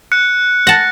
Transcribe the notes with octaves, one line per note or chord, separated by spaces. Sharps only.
F#6 C#7
F#5 A5 A#6